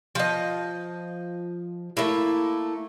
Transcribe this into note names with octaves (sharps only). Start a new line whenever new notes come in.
F3 D#5
A3 A#3 E4